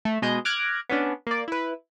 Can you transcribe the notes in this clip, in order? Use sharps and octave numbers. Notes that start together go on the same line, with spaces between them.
A3
B2 G#3 D#5 G6
D6 F6 F#6 G#6 A#6 D7
B3 C#4 D4
A#3 D5
E4 B4